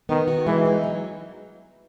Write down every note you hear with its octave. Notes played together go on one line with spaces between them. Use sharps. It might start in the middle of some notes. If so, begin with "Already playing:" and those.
D#3 B3
F#4
E3 G#3
D#4
F#3